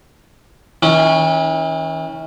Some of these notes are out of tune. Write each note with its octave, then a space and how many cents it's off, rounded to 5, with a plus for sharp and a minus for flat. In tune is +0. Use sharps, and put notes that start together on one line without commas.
E3 -45 C#4 +0